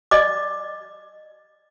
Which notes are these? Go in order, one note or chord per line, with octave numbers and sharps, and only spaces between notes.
D5 D#5 D6